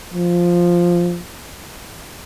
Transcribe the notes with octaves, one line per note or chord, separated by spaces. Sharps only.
F3